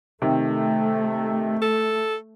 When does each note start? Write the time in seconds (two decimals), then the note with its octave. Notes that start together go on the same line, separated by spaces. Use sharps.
0.22 C3 D#3 A3
1.62 A4